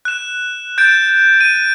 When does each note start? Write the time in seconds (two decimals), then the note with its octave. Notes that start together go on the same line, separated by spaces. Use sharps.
0.05 F#6 E7
0.78 G6 A6 D7
1.41 D#7